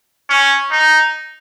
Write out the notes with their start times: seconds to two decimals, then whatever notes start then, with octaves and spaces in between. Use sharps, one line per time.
0.30 C#4
0.72 D#4